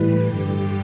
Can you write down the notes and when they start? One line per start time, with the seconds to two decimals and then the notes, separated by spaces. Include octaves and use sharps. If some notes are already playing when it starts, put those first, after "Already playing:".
Already playing: A2 E3 G3 B4
0.25 G2 D3 G3 G4